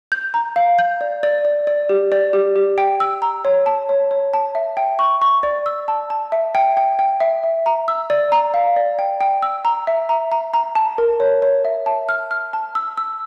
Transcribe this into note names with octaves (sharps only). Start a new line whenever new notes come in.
G6
A#5
F5
G6
D5
D5
D5
D5
G4
D5
G4
G4
G5
E6
A#5
C#5
A5
C#5
C#5
A5
E5
G5
C#6
C#6
D5
E6
A5
A5
E5
G5
G5
G5
E5
E5
A#5
E6
D5
A#5
F5
D5
G5
G5
E6
A#5
E5
A#5
A#5
A#5
A5
A#4
C#5
C#5
E5
A5
F6
F6
A5
E6
E6